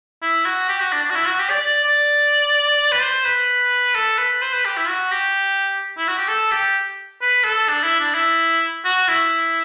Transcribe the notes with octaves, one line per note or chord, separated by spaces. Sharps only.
E4
F#4
G4
F#4
D4
D4
F#4
E4
F#4
G4
D5
D5
D5
B4
C5
B4
A4
B4
C5
B4
G4
E4
F#4
G4
E4
F#4
G4
A4
G4
B4
A4
D4
E4
D4
E4
F#4
E4